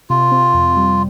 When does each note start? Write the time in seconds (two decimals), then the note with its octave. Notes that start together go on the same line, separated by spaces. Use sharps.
0.10 C3 F4
0.32 C4
0.54 F2
0.76 G3